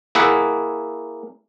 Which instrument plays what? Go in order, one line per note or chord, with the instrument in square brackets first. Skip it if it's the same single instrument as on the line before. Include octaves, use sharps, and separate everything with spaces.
[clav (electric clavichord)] A#3 E4 G#4 E5 F#5